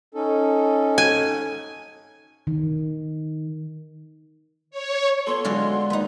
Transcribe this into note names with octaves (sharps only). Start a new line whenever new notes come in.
C#4 D#4 A4
G#5
D#3
C#5
B3 F4 A4 C6
D3 F#3 G#3 F4 F#4
D#2 D#4 B4